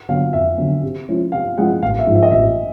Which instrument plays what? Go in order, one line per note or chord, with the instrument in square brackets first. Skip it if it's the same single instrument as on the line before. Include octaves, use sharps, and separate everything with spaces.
[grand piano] D3 F#3 B3 [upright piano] F5
[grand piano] F2 [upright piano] E5
[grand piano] D3 F#3 B3
C3
F3 G#3 C#4 E4
[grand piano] C3 [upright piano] F5
[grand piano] F3 G#3 C#4 E4 [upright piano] F#5
[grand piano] A1 [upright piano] F5
[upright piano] E5
[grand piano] G#2 F3
[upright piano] E5
D#5
[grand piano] A1 [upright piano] E5